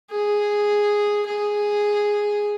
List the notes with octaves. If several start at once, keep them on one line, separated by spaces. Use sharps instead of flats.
G#4
G#4